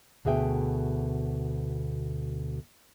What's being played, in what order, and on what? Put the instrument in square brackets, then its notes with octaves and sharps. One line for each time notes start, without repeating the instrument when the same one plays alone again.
[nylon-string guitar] D2 B2 G#4 E5 G5